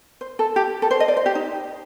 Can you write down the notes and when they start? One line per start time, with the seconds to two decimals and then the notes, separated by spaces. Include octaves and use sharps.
0.21 C5
0.39 A4
0.56 G4
0.82 A4
0.91 C5
1.00 D#5
1.08 D5
1.17 C5
1.26 G4
1.35 D#4